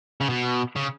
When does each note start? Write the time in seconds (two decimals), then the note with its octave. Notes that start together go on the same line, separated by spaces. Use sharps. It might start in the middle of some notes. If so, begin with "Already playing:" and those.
0.21 C#3
0.29 B2
0.76 C#3